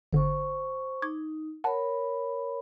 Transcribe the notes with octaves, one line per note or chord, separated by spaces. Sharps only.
G#1 D3 C5 C#6
D#4 C#6 D6 G#6
A#4 C#5 F#5 A5 B5